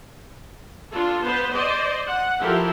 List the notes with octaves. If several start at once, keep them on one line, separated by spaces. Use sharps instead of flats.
D4 F4 A4
B3 B4 C5
C5 D5 D#5
F#5
F3 E4 G4 A4 A#4